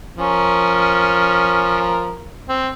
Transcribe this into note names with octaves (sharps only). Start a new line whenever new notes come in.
F3 C#4 A#4
C4